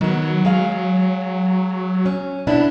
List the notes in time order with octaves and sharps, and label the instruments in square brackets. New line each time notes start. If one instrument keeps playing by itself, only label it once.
[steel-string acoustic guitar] D#3 B3 [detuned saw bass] F#3
[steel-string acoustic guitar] G#3 F5
C#4
[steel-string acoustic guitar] B2 B3 D4 [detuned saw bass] E4